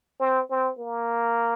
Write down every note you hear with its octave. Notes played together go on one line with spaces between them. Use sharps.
C4
C4
A#3